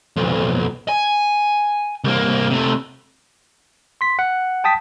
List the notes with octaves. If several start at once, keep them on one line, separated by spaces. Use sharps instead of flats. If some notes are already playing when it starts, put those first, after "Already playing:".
B1 F2
G#5
C2 A#3
C3 A3
C6 B6
F#5
G5 A5 D#6 B6